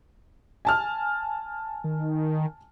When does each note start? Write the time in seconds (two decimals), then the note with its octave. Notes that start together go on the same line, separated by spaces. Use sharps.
0.65 G#5 A5 F6
1.84 D#3